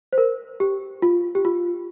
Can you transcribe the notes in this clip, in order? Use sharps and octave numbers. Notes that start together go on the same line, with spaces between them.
C5
A#4
G4
F4
G4
F4